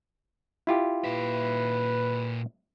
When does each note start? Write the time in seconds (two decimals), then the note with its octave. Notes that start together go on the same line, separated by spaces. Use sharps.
0.67 E4 F4 G4
1.04 A#2 B4 E5